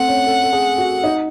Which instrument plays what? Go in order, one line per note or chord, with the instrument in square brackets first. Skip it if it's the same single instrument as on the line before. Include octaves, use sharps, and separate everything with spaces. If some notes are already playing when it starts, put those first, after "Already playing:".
Already playing: [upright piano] A3 C4 [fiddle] F#5
[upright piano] C#4
A4
A4
G#4
F#4
D#4